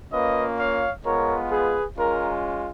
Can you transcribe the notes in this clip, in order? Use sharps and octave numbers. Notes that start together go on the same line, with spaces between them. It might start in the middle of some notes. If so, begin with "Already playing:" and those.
A#3 C#4 F4 B4 D#5
C#5 F5
G#3 B3 F4 A#4 C#5
G#4 B4
G#3 C#4 F4 A#4